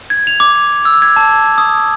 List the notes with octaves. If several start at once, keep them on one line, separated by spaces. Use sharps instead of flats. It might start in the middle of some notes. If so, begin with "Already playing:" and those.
G#6
F7
D6
E6
G#6
A5
D#6